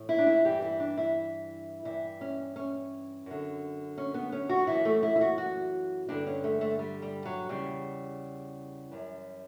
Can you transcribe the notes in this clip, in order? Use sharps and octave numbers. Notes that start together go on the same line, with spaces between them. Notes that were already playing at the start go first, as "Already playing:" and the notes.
Already playing: A2 E3
E4
D4
E4
G2 E3 G4
E4
D4
E4
G2 E3 E4
C#4
C#4
F#2 D3
C#4
B3
C#4
F#4
F#2 E3 E4
A3
E4
E4
F#4
F#4
G2 D3 D4
C#4
A3
A3
G3
G3
F#3
E2 C#3 E3 G3
F#2 E3